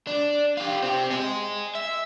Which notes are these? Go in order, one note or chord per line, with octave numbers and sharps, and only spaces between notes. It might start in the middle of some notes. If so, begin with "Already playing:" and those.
D4
F4 G4
C4 G4
D#5 G#5
E5